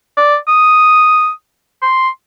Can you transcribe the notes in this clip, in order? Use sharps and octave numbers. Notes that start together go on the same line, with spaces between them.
D5
D#6
C6